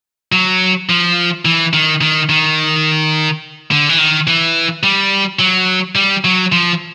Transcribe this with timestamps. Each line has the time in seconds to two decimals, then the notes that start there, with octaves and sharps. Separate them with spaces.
0.32 F#3
0.90 F3
1.45 E3
1.73 D#3
2.01 D#3
2.29 D#3
3.71 D3
3.89 E3
3.98 D#3
4.27 E3
4.83 G3
5.39 F#3
5.95 G3
6.24 F#3
6.52 F3